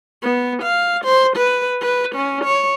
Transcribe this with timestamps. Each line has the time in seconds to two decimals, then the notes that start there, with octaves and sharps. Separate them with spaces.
0.23 B3
0.63 F5
1.05 C5
1.37 B4
1.81 B4
2.15 C#4
2.45 C#5